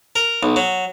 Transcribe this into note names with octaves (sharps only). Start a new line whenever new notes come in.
A#4
B1
F#3